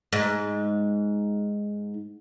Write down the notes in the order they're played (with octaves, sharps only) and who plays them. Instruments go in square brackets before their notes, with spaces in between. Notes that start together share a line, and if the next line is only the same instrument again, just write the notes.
[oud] G#2